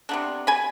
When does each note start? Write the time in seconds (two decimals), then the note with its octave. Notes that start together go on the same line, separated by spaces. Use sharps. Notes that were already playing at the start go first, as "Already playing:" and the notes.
0.09 C3 F3 B3 D4
0.47 G#5 B5